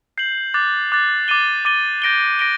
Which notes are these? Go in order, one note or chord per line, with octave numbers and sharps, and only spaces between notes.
G6 C7 F#7
D6 F#6 A6
D6 F#6 A6
D6 A6 D#7 G7
D6 A6 D#7 G7
G6 A#6 D7 G7
A#6 D7 G7